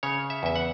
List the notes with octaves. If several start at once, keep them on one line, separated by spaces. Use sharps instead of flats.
C#3 C#5
E5
E2 E5
F#5